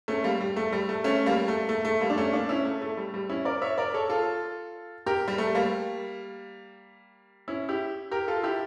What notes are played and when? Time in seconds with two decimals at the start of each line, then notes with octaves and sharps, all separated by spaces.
0.08 A3 C#4
0.24 G3 A#3
0.41 G3
0.57 A3
0.73 G3
0.89 A3
1.04 A3 C#4
1.26 G3 A#3
1.48 A3
1.69 A3
1.85 A3
2.01 G3 A#3
2.10 D4
2.18 A3 C#4
2.33 A#3 D4
2.49 C#4 E4
2.65 A3
2.82 A3
2.97 G3
3.14 G3
3.30 C#4 E4
3.45 A#4 D5
3.62 C#5 E5
3.78 A#4 D5
3.94 A4 C#5
4.10 F4 A4
5.06 G4 A#4
5.28 G3
5.38 A3
5.55 G3 A#3
7.48 C#4 E4
7.69 E4 G4
8.11 G4 A#4
8.28 F4 A4
8.43 E4 G4